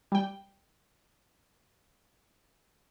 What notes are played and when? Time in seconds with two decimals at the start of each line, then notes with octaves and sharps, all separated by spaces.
0.12 G3 G5